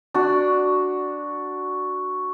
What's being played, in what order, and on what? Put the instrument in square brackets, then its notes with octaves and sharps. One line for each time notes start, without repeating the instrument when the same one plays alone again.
[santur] D4 F#4